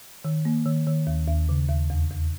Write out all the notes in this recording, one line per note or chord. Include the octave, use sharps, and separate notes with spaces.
D#3
A#3
D#3
D#3
D#2
D#2
C#3
D#2
E2
E2